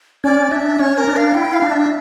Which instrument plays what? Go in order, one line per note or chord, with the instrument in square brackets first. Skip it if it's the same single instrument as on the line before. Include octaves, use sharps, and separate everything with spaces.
[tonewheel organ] C#4 [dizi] D5
[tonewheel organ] D4 [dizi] E5
[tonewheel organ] C#4 [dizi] C#5
[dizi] A#4
[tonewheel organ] D4
[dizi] F5
[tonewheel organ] E4 [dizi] G5
[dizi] F5
[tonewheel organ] D4
[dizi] E5